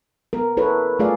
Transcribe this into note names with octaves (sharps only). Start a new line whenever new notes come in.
B3 A#4
E4 A4 B4 C#5
A3 F4 G#4 D5 F5